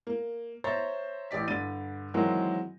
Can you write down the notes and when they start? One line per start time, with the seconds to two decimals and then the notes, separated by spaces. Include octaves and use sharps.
0.07 A#3
0.64 C5 C#5 E5 A#5 A6
1.31 A1 G4 D5 B6
1.48 G2 D3 A6 D#7
2.14 D#3 E3 F#3 G#3 A#3 C4